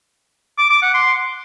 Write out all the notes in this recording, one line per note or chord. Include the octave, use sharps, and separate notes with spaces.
D6
D6
F#5
C6